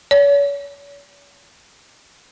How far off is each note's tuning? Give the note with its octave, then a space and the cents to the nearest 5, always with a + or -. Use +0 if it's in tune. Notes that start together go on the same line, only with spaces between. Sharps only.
C#5 +40